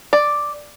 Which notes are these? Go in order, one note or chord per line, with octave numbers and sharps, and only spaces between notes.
D5